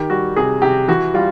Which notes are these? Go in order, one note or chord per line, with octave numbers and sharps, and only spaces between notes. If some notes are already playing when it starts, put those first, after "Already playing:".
Already playing: D#3 G4
G3 F#4
C3 G#4
C3 G4
E3 F#4
G3 F4